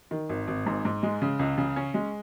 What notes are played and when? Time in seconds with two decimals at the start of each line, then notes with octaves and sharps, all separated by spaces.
0.11 D#3
0.29 G#1
0.48 G#1
0.66 G#2
0.85 G#2
1.03 G#3
1.22 C#3
1.39 C#2
1.58 C#3
1.76 C#4
1.94 G#3